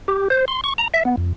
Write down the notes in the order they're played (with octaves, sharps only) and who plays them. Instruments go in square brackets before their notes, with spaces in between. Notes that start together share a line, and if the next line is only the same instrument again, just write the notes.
[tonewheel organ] G4
C5
C6
C#6
A#5
E5
B3
F2